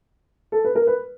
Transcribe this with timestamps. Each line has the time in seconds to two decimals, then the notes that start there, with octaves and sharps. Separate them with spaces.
0.52 A4
0.65 B4
0.75 A#4
0.87 B4